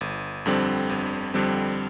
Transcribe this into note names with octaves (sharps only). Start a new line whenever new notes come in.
G1
F2 D3 G3 C4
G1
F2 D3 G3 C4